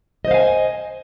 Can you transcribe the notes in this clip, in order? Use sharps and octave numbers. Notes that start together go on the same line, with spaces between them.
C5 D#5 F5 G#5